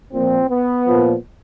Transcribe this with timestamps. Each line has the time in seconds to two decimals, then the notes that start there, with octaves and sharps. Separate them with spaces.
0.12 A#2 F3 C4
0.49 B3
0.87 A#2 F3